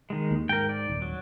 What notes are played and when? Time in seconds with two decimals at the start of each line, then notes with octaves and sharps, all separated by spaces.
0.10 D#3 G#3
0.31 D#2
0.49 G#2 A#4 G5
0.69 D5
0.89 D#1
1.02 F#3